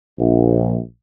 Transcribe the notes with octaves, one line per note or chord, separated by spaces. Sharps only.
A#1